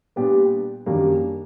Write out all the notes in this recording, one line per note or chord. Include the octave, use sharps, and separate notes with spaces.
A#2 G3 B3 D4 G4
F#2 D#3 G3 A#3 D4